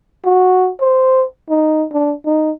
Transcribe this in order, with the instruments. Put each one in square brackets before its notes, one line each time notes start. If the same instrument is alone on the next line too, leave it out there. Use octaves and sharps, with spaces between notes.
[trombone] F#4
C5
D#4
D4
D#4